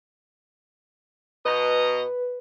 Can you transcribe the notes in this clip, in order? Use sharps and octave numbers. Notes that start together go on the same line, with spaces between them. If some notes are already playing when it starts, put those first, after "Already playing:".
B2 B4 D#5 A#5